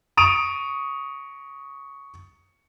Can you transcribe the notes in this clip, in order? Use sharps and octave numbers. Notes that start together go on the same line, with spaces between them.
C#6 D#6 D7 D#7 F7